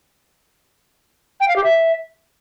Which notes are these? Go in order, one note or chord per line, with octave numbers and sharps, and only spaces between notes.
G5
F5
G4
E5